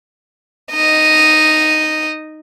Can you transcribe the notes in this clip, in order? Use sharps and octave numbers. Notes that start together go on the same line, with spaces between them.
D#4 D#5